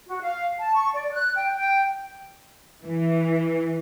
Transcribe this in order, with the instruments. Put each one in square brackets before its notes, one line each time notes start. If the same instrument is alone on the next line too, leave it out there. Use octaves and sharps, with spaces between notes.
[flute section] F#4
F5
A5
C#6
D5
F#6
G5
G5
[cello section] E3